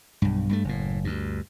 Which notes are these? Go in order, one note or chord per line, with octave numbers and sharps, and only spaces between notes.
B1 G2
G2 F#3 A3
F#1 A2
D2 G2